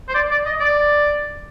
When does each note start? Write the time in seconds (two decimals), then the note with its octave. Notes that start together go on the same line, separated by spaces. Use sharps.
0.09 C5
0.15 D5
0.31 D5
0.46 D#5
0.60 D5